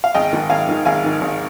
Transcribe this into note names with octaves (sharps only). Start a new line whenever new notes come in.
F5
G#1 D#5 G5
G#2 D#3
G#1 F5 G#5
G#2 D#3
G#1 F5 G#5
G#2 D#3
G#1